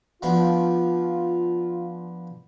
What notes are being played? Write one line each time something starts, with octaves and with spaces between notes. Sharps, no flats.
F3 B3 D4 F4